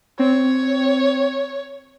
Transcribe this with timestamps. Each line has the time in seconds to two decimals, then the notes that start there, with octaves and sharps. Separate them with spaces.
0.19 C4 C#5